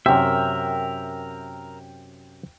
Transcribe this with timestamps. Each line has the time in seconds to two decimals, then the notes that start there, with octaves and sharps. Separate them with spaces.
0.06 F#2 C3 A#4 E5 G5